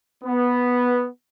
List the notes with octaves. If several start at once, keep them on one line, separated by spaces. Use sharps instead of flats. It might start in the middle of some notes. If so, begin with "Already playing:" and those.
B3